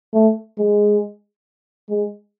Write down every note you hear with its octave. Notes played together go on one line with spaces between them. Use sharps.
A3
G#3
G#3